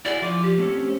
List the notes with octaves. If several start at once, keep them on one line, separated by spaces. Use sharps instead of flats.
E4 F#4 G#4 D5
F3 F4 D6
G4
A3 C4 C#4